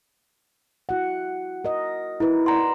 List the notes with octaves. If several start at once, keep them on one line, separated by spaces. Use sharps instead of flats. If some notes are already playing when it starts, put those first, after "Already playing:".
E4 F#4 F#5
A#4 D#5
D#4 E4 A#4 B4
D5 F#5 A#5 C6